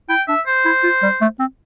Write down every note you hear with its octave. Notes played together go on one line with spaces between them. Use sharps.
E4 G5
D4 E5
C5
E4
F4
G3
A3
C4